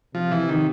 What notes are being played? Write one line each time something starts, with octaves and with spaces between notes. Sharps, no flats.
C3 F3
E3
D#3